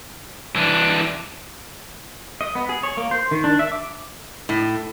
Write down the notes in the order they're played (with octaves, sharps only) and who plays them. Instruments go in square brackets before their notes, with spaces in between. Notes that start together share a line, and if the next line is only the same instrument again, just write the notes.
[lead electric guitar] E3 D4
[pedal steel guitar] D#5
B3
G#4
C#5
A#3
C5
D#3
D4
E5
D6
[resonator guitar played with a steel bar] A2